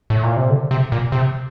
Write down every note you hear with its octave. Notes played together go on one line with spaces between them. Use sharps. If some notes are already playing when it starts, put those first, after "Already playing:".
A2
A#2
C3
D3
C3
A#2
C3